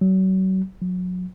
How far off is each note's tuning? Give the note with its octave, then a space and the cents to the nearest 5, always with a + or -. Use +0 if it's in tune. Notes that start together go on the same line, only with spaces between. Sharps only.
F#3 +35
F#3 -25